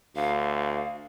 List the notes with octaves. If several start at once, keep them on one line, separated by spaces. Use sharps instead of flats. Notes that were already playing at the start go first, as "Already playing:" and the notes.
D2 F5